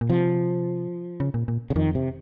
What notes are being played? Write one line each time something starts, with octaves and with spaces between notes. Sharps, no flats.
A#2
C3 F3
C#3
A#2
A#2
C#3
F2 D#3
C3